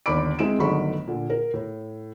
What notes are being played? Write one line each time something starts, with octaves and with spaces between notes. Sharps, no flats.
G1 D#2 D5 B5 D6 D7
G#3 C4 E4 D7 E7
G1 D#3 F#3 A3 B5 C#6
A#2 D3
A#4
A2